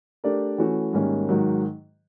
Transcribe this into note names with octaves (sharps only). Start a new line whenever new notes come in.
A3 D4 G4 A#4 D5
E3 A3 C#4 F#4
G#2 D#3 G3 A#3 C#4
G#2 D#3 F#3